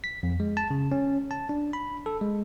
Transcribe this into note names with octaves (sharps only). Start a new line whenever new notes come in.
B6
F2
G#3
A5
C#3
C#4
A5
D4
B5
A4
G#3